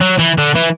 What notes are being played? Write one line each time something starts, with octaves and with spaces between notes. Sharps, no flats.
F#3
E3
D3
E3